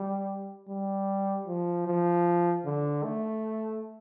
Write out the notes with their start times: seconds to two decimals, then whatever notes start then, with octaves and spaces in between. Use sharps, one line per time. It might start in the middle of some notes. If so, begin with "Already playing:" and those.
Already playing: G3
0.69 G3
1.47 F3
1.87 F3
2.65 D3
3.04 A3